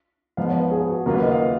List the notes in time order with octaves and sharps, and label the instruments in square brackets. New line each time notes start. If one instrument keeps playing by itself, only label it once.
[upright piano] G#2 F3 B3 D#4 [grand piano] F5
[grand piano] C#5
B4
G#4
F#4
[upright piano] D#2 C#3 F#3 A#3 F4 [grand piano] A#4
[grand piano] B4
D#5
F5